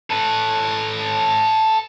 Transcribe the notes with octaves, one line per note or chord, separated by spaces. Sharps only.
A4 B4